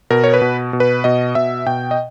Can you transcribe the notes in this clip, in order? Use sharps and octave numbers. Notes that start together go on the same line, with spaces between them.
B2 A#4
C#5
B4
B2
B2
B4
B2 D#5
B2 E5
B2 G5
D#5